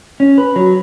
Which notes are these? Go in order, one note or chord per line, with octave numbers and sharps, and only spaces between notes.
C#4
B4
F#3